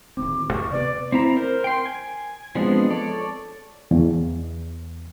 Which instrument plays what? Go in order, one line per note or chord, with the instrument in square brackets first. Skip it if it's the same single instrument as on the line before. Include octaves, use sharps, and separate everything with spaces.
[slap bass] D1 D#3 C4 [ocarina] D6
[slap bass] E2 [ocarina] C#6
[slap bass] C3 A#3 B3 [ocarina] B4 [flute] D5
[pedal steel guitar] C4 E4 A#5
A#4 C5
G5 C6
G#5
F3 G#3 B3 C4 D4
A4 C#5 D5
[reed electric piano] E2